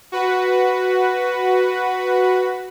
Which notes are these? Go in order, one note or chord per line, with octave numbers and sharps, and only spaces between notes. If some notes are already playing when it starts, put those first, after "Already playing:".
F#4 B4